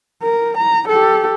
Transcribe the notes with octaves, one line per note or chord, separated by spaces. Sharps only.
A#4
A#5
G4 A4